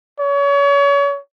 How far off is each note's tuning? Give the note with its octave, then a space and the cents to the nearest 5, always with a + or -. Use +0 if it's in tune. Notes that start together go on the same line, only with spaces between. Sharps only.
C#5 +35